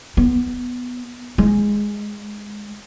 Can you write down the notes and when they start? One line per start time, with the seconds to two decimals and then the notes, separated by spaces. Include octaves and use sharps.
0.17 B3
1.38 G#3